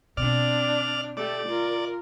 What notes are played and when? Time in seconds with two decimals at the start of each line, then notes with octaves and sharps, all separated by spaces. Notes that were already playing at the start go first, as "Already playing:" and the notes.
0.17 B2 D3 C4 D4 D5 F6
1.17 A3 G4 D5
1.48 F4 A#4